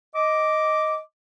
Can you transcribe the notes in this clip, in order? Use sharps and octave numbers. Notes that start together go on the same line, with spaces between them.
D#5 D6